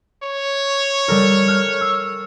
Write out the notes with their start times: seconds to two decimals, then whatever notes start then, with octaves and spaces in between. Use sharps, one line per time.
0.23 C#5
1.08 G3 A4 A#4
1.48 F6 F#6
1.81 E6 C7